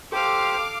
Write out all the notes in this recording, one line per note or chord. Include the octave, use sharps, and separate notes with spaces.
G4 A4 C5 F5 D6